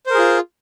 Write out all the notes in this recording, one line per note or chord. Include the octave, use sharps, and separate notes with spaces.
F4 G#4 A#4 C5